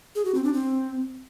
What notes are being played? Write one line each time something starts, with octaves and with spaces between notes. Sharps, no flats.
G#4
F#4
C4
D4
C4